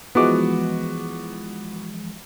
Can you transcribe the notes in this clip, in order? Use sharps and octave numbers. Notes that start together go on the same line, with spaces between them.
E3 F3 G#3 B3 F#4 D6